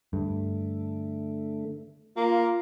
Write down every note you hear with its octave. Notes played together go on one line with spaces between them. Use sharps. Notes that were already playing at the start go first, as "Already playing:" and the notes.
G2 D3 A3
A#3 F4